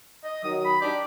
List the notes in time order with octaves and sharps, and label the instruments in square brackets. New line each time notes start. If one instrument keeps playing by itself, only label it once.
[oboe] D#5
[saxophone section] D#3 F#3 [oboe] D#6
[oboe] B5
[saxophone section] D4 D#4 D5 [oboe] G4